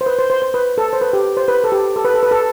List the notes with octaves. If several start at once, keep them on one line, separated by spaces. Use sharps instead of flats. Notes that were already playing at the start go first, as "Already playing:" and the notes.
C5
B4
C5
C5
C5
B4
A4
C5
B4
G4
C5
B4
A4
G4
A4
B4
A4
B4
A4